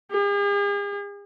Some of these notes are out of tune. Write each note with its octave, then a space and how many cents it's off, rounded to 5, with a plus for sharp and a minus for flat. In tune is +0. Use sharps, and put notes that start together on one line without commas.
G#4 -45